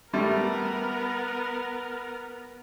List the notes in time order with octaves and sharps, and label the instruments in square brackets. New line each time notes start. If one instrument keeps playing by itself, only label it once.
[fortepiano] G3 A3 [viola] B3 A#4